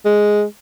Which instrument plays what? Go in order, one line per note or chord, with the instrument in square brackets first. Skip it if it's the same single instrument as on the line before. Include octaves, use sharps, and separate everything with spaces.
[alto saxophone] G#3